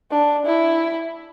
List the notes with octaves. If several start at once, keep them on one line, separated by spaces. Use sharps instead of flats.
D4
E4